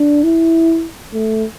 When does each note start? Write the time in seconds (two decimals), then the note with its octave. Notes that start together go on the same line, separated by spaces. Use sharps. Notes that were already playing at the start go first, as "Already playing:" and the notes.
Already playing: D4
0.24 E4
1.13 A3